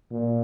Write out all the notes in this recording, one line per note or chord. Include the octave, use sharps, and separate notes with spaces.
A#2